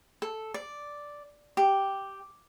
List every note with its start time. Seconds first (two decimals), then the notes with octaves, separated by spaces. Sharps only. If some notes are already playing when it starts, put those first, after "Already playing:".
0.22 A4
0.54 D5
1.57 G4